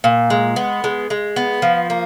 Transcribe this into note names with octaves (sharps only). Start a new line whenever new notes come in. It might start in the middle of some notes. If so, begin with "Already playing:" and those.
A#2
G#3
B3
G#3
G#3
B3
F3
A#3